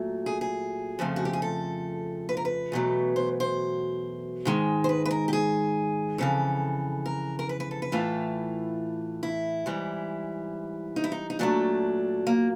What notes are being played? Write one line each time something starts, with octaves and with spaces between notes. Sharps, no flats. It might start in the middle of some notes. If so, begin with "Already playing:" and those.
Already playing: A#2 F#3 A3
G#4
G#4
F2 C#3 F3 A3
F#4
G4
G#4
A4
B4
A#4
B4
E2 B2 F#3 A3
C5
C5
G#2 D#3 G#3
C5
B4
B4
A#4
G4
G#4
F2 C#3 E3 A4
A#4
A#4
B4
B4
A4
B4
A2 E3 A3 F4
E4
G#2 E3 G3
D#4
E4
D#4
D#4
A#2 F#3 A3 D4
A#3